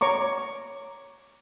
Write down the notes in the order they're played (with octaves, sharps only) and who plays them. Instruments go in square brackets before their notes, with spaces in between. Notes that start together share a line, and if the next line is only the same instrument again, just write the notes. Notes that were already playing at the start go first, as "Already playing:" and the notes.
[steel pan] C#5 A#5 C#6 D6